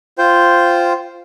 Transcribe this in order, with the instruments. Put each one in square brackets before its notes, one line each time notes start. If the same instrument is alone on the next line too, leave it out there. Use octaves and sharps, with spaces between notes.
[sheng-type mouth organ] F4 C5 G5